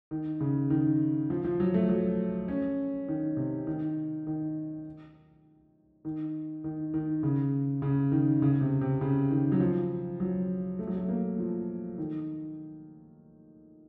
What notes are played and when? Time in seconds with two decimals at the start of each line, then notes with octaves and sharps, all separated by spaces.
0.11 D#3
0.41 C#3
0.70 D#3
1.30 F3
1.44 F3
1.60 F#3
1.74 A3
1.89 F#3
2.48 C#4
3.08 D#3
3.37 C3
3.67 D#3
4.27 D#3
6.05 D#3
6.64 D#3
6.94 D#3
7.23 C#3
7.82 C#3
8.12 D#3
8.42 C#3
8.61 C3
8.81 C3
9.01 C#3
9.31 D#3
9.52 F#3
9.60 F3
10.20 F#3
10.79 A3
10.87 F#3
10.96 A3
11.09 A#3
11.39 F3
11.98 D#3